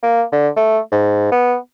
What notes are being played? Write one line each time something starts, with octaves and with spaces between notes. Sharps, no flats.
A#3
D3
A3
G#2
B3